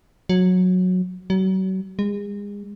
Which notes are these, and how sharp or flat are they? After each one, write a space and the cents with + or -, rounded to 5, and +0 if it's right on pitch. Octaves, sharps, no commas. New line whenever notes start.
F#3 -15
F#3 +35
G#3 -35